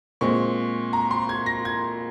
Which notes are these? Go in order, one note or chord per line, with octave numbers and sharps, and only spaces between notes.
A#2 G#3 C4 C#6
A#5
C6
G#6
A#6
G#6